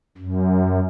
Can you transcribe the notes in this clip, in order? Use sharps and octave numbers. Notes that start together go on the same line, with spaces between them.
F#2